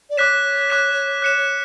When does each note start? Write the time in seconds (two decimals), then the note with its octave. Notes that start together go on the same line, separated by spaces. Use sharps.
0.10 D5
0.17 C#5 D6 F#6 B6 E7
0.70 D6 F#6 B6 E7
1.22 F#6 C#7 E7